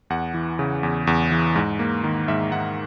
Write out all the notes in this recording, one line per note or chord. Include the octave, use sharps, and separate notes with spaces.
E2 F#5
E3
C#3
E2
E2
E3
G#2
A#3
D#3
G#2 E5
G#2 F#5